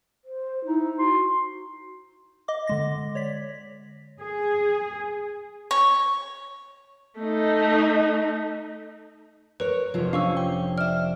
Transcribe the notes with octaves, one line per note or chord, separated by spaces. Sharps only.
C5
D#4 E4
F#4 C6
D#5 D6
D3 G#3 A#6
C#5 D5 B6
G#4
C#5
A3 D#4
A#4 B4 C#5
F1 F#3 F4
C#4 D4 F5 C#6 E6
G5
D5 E5 F6